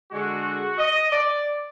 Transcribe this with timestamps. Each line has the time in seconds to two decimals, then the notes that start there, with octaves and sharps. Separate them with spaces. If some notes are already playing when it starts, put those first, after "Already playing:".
0.11 D3 G#3 F#4
0.78 D#5
1.11 D5